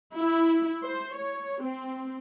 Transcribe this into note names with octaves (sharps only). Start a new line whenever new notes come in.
E4
C5
C#5
C4